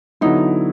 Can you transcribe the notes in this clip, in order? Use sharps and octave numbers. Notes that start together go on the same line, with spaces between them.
D3 F#3 B3 D#4 E4